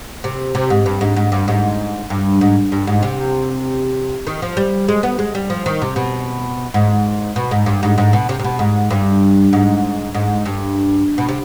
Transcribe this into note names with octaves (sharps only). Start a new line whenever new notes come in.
C3
C3
G#2
G2
G#2
G#2
G2
G#2
G2
G#2
G2
G#2
C3
D#3
F3
G3
G#3
B3
G#3
G3
F3
D#3
C3
B2
G#2
B2
G#2
G2
G#2
G#2
B2
C3
C3
B2
G#2
G2
G#2
G#2
G2
B2
C3